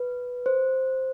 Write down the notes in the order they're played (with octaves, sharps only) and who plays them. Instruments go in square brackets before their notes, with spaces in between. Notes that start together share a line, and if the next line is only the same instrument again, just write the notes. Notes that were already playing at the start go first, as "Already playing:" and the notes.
Already playing: [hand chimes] B4
C5